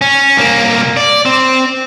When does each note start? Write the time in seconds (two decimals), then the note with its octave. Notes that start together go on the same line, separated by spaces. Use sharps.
0.01 C#4
0.37 C2 A#3
0.97 D5
1.25 C4